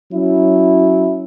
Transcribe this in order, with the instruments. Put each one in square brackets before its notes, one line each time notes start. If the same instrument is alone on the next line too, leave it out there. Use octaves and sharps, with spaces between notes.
[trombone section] F#3 C#4 E4